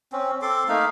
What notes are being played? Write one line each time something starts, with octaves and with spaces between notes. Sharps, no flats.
C4 C#4
C4 A4 C6 D6
A3 A#3 D#4 F5